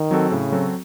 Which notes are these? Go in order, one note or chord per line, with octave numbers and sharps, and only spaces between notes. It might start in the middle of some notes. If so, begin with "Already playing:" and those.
Already playing: D#3
F#3 C4 F#4 A4
A2 C#3
F#3 C4 F#4 A4